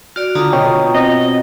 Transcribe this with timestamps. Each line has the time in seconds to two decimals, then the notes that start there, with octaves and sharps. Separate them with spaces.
0.16 F#4 D5 F6
0.35 D3 F4 A#5 D#6
0.53 B2 C#5 D#5 G5
0.94 C4 D#5